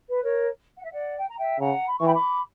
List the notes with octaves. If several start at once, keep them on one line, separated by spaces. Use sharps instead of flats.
B4
A#4 C#5
F#5
E5
D5 F#5
G5
A#5
E5 G5
C#3 F#5 A#5
B5
C#6
E3 G5 B5
B5 D6